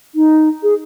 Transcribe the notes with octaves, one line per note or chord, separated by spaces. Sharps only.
D#4
G#4